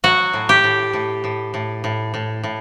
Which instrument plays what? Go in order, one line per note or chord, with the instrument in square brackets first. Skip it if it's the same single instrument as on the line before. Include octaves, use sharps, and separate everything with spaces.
[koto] F#3 F#4
A2
G4
A2
A2
A2
A2
A2
A2
A2